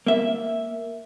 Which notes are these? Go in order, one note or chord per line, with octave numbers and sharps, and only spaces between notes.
A#3 E5